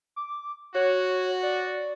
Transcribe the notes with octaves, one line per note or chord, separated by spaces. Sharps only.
D6
F#4 C#5
D5